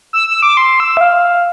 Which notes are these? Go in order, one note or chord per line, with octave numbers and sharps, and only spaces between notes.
E6
E6
D6
C6
E6
E5
F5